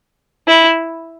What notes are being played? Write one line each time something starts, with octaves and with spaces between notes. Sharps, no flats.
E4